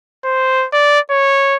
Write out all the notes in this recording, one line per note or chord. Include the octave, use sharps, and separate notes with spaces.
C5
D5
C#5